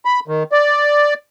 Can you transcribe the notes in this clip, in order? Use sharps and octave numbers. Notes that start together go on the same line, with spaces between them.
B5
D#3
D5